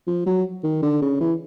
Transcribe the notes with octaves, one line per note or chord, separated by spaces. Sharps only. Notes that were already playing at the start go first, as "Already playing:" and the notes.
F3
F#3
D#3
D3
C#3
E3